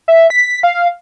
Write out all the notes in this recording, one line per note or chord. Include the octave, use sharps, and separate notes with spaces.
E5
B6
F5